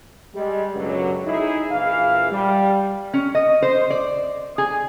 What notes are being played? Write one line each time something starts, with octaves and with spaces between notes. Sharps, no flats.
G3 G#3
C#2 F#2 B2 D3 F#3
D#4 E4 G#4
A#1 E3 F5
G3
C#4
D#5
C5
D5
G#4